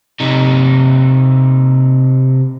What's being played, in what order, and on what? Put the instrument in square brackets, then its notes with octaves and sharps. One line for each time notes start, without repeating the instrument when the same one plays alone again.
[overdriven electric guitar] C3 D#4